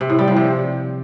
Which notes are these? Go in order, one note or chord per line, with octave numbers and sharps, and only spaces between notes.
C3
A2
G3
F3
C3